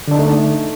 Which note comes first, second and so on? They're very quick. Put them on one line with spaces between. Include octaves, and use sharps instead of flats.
D3 D4 D#4 A3